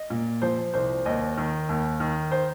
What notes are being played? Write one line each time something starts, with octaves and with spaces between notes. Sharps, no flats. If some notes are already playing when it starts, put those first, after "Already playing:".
Already playing: D#5
A#2
F3 C5
C2 C5
D#2 D#5
D#3
D#2
D#3
C5